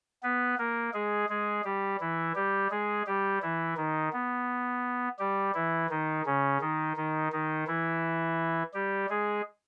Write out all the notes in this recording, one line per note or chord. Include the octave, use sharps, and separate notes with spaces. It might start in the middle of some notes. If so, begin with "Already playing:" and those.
B3 B4
A#3 A#4
G#3 G#4
G#3 G#4
G3 G4
E3 E4
G3 G4
G#3 G#4
G3 G4
E3 E4
D#3 D#4
B3
G3 G4
E3 E4
D#3 D#4
C#3 C#4
D#3 D#4
D#3 D#4
D#3 D#4
E3 E4
G3 G4
G#3 G#4